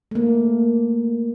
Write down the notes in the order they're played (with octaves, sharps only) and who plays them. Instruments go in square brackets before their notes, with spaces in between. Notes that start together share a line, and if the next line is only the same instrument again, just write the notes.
[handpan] A3 A#3